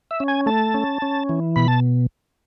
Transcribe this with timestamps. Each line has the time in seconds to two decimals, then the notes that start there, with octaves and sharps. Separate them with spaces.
0.11 E5
0.20 C#4
0.28 G#5
0.46 A3 A5
0.74 C#4
1.02 C#4
1.29 E3
1.56 B2 B5
1.68 A5